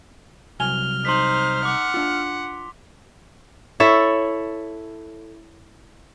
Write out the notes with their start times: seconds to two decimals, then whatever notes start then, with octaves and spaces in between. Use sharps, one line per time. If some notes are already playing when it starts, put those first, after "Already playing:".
0.60 C2 F#3 G#5 F6 F7 G7
1.05 D#4 C5 C6 B6
1.65 F#5 D6
1.94 D4 F4
3.80 E4 A4 C#5 E5